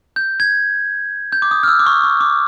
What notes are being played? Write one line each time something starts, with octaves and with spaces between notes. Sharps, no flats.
G6
G#6
G6
D6
D#6
F6
E6
D6
C#6
C#6
D6